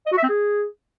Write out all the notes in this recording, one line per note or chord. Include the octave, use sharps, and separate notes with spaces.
D#5
F#4
E5
C4
G#4